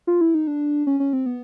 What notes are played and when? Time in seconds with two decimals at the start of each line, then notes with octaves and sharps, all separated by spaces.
0.07 F4
0.21 E4
0.35 D#4
0.47 D4
0.87 C#4
1.00 C#4
1.13 C4
1.26 B3